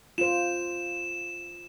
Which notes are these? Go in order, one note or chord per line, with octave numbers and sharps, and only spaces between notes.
F4 C5 E7